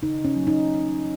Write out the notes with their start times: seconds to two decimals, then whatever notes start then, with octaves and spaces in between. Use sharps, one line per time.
0.02 C#3 D#4
0.25 C#4
0.36 F#3 A#3
0.47 D#4